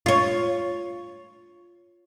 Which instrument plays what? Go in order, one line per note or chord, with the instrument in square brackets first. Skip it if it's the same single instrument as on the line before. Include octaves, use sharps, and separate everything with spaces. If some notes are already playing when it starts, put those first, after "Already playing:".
[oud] F4 C#5